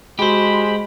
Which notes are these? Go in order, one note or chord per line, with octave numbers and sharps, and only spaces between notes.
G#3 F#4 G4 C5 B5